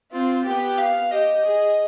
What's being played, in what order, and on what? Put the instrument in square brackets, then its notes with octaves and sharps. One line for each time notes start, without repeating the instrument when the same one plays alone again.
[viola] C4 [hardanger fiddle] F4
[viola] B3 [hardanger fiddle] G4
[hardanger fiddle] F5
[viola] G4 [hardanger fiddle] D#5
[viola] G#4